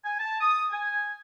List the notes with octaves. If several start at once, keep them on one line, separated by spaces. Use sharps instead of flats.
G#5
A5
D#6
G#5